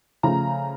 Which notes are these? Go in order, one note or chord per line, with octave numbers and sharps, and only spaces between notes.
C#3 F3 A3 A#5